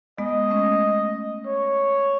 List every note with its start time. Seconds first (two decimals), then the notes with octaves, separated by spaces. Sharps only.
0.18 G#3 B3 D#5
0.50 A3 C#4
1.47 C#5